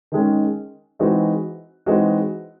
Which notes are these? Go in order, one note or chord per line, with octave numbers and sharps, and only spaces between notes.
D#3 G#3 C#4
E3 G#3 C4 D#4 F#4
E3 G#3 C4 D#4 F#4